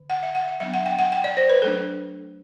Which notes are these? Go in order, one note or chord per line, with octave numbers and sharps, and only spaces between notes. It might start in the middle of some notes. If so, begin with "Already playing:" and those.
Already playing: D3
F#5
E5
F#5
E5
F#3 B3 D4 E5
F#5
G5
F#5
G5
D5
C5
B4
F#3 A3 D4 A4